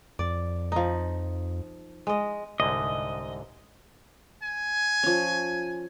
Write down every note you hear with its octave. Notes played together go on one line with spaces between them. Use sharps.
F2 D5
F3 D#4
G#3 D#5
C2 G#2 D3 D#5
G#5
F3 C#4